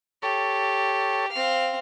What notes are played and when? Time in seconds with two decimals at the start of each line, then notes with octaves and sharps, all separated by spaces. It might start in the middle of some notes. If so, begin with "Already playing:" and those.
0.23 G4 A4 C#5
1.32 C4 F5